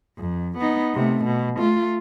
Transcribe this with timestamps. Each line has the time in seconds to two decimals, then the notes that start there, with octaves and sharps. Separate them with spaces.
0.18 F2
0.58 B3 D#4
0.94 C3 A3
1.25 B2
1.57 A3 F4